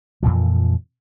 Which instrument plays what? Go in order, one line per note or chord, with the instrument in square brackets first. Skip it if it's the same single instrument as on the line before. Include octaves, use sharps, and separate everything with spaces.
[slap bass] F2 A#2 E3 F3